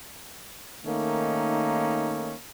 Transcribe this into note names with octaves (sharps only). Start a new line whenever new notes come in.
D#3 A3 A#3 C#4 D#4